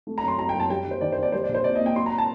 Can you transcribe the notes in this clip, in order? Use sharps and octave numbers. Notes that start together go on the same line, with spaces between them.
A3
F#2 A#5
C6
F#3 A#5
G5
F#2
A5
G3 G5
D#2
C5
D#3 D5
C5
D#2
D5
G3 C5
D5
A#1
C5
A#2 D5
A#3 D#5
G5
F#3 C6
A#5
A5